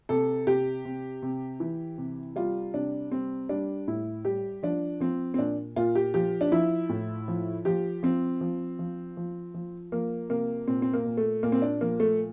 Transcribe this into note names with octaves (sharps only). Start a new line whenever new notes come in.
C3 A4
C3 G4
C3
C3
E3
C3
G3 F4
C3 D4
G3 C4
G3 D4
A2 E4
G3 G4
F3 D4
F3 C4
C4
A#2 D4
A#2 F4
G4
F3 G4
D4
F3 E4
A2
F3
F3 G4
F3 C4
F3
F3
F3
F3
F3 A#3
C3 A#3
A#2 C4
C4
A#3
A#2
A3
A#2 A#3
C4
D4
F3 A#3
A3